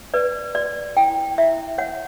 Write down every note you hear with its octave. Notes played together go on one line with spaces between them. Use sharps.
B4 D5
F#4 D5
E4 G5
E4 E5
C#5 F#5